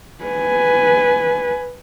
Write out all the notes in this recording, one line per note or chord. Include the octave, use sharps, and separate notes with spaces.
B4 G#5